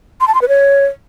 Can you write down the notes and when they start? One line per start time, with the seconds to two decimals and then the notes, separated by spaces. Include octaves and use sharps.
0.21 C6
0.28 A5
0.35 C6
0.42 B4
0.49 C#5